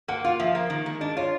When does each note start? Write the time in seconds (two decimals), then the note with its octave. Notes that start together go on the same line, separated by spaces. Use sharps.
0.08 A#3 F#5
0.24 F4 F5
0.40 F3 E5
0.55 A#3
0.70 D#3
0.86 G#3
1.01 D4 D#5
1.17 F4 C#5